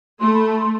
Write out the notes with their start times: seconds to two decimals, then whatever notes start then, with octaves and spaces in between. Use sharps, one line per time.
0.20 A3 C6
0.33 B5
0.47 A5
0.60 C6